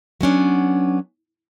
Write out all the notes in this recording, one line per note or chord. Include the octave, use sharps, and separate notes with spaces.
F#3 B3 C#4 D4